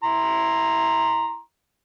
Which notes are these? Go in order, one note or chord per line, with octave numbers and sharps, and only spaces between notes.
E4 A#5 C6